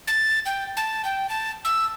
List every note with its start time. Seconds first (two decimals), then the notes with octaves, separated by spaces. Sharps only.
0.07 A6
0.46 G5
0.77 A5
1.05 G5
1.29 A5
1.65 E6